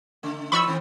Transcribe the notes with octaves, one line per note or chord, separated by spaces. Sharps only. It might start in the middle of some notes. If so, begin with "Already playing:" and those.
C#3 A3
E3 D#4 B4 B5 C#6 E6
A2 D#3 C4